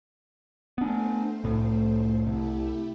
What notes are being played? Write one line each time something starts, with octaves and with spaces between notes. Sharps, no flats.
A3 B3 D4 C5
C2 A2
C2 A3 E4 G4